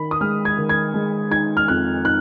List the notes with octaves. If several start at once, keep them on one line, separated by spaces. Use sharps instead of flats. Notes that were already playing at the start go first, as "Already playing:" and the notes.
Already playing: D#3 B5
D#6
G#3 F6
G#6
D#3
G#6
G#3
D#4 G#6
F6
F2 F#6
D#4 F#6